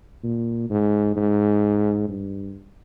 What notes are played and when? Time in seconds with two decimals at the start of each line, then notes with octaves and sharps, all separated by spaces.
0.23 A#2
0.70 G#2
1.16 G#2
2.08 G2